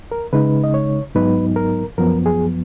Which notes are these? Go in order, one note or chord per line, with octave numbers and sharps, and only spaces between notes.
A#4
C#3 G#3 D#4 B4
D#5
C#5
G#2 F#3 B3 D#4 B4
A#4
F#2 F3 B3 A#4
G#4